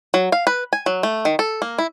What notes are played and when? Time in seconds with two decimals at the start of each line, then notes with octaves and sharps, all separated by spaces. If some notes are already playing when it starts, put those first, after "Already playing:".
0.14 F#3
0.32 F5
0.47 B4
0.73 G#5
0.86 F#3
1.03 A3
1.25 D#3
1.39 A4
1.62 A#3
1.78 E4